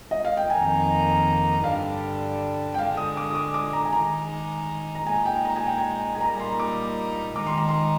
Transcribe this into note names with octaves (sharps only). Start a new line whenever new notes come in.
D#5
F5
G5
F2 D#3 A#3 D#4 G#5
G2 D3 G3 D4 F5
G5
D3 G#3 D4 F5
D#6
D6
D#6
D6
D6
A#5
G#5
D#3 G#3 D#4 A#5
A#5
A#2 G#3 D#4 G#5
G5
A#5
G#5
G5
G#5
G#5
A#2 G3 A#3 D#4 A#5
C6
D6
D#3 G#3 D#4 D6
C6
A#5
C6